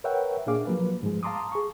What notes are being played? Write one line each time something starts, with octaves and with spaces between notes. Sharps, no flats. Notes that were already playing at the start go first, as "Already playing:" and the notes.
A#4 B4 C#5 E5 F#5 G5
A#2 A#3 D4 G#4 F5 D6
F3 F#3 A#3 B4
G#2 F3 G#3
F5 A5 A#5 C6 D6 D#6
G#4 C#6